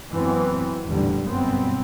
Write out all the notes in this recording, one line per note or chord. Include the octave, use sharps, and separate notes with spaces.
F#2 E3 F#3 B3 C4
A1 E2 A#2 D3 G3
G1 F#2 B2 B3 C4